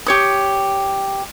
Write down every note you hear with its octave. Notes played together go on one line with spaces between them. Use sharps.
G4 C#5 D#6